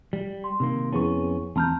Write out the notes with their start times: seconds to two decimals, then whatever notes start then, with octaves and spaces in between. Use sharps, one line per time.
0.13 G3
0.44 C6
0.60 C3 D#3 A#3
0.93 F2 B3 C#4 E4 G#4 C#6
1.56 E2 C4 A5 A#5 F6 G6